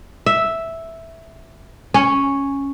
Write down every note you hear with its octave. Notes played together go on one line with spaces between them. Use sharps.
E5
C#4